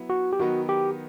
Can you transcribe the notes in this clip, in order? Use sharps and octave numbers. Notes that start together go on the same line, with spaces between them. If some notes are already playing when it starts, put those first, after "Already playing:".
Already playing: F#3 B3 E4
F#4
G4
D#3 F#3 B3 D#4 F#4
G4